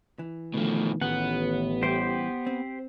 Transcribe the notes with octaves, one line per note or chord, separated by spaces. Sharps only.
E3
B2 D3 D#3 F3 A3
A1 D#3 B3 F4 G#4 F#5
E3 G3 E4 G4 C5 G5
C4